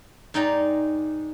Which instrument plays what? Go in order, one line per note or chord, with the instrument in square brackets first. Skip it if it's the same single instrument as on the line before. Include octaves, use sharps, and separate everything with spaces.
[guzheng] G#2 D#4 D5 G5 A#5